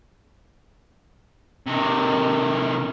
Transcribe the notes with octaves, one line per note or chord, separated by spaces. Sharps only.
C3 D#3